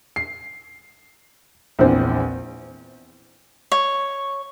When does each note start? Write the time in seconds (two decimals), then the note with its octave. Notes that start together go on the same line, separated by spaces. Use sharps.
0.16 C7
1.79 A#1 E2 C4 C5
3.72 C#5